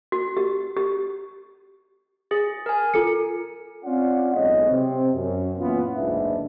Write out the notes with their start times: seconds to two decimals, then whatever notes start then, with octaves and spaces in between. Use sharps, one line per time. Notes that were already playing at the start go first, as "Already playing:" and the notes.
0.12 F#4
0.37 G4
0.77 G4
2.31 G#4 A6
2.66 A#4 G#5
2.94 F4 A4 C#7
3.85 C4 C#4 F4 D5 F5 F#5
4.34 B1 A2 G#3 C#5 D#5
4.70 C3 C4
5.14 F#2
5.59 A#2 E3 B3 C#4 E4 F4
5.95 F#1 D2 G#2 D4 B4 E5